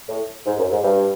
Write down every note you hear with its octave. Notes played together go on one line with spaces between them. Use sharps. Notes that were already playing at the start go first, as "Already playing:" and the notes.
A2
G#2
F#2
G#2
G2